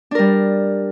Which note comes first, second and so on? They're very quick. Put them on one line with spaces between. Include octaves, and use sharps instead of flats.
D4 A#4 G3